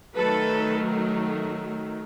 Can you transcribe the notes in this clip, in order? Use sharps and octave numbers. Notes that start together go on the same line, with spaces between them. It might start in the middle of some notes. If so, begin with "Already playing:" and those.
D#3 F#3 A3 A4 B4